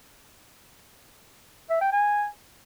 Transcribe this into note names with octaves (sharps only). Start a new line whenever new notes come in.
E5
G5
G#5